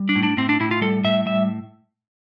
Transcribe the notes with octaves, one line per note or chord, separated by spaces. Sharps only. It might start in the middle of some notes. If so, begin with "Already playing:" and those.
Already playing: G3
D4
A2
D4
A2 C4
D4
A2 E4
F4
G3 A4
A2 E5
G3 E5